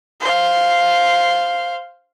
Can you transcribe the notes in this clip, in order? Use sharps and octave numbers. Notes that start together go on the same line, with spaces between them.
C5 F5